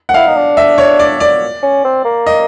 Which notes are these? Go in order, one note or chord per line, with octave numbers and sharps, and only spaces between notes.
F#5
E4 F5
D#4
D4
E5
C#5
D5
D5
C#4
C4
A#3
D#5